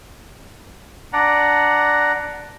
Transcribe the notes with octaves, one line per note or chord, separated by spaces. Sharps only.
D4 D5 F#5 A#5